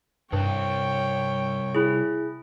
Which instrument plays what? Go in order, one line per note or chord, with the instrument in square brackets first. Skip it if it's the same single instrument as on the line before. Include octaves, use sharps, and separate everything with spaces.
[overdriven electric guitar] C2 [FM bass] G2 [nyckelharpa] C#5 G5
[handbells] E4 G#4